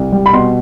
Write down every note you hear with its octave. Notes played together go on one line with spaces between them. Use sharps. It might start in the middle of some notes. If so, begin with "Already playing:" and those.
Already playing: C2
G3
B5
B2 C6